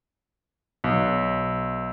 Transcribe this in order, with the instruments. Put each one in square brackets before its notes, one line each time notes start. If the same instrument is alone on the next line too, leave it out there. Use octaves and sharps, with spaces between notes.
[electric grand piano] B1